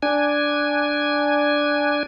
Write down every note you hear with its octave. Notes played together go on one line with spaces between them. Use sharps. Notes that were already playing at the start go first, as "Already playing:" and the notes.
D4 G#5